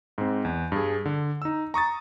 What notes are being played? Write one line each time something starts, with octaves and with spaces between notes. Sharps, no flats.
G#2 C4
E2
G2 G#4
D3
D#4 E6
A#5 C#6 D#6 A6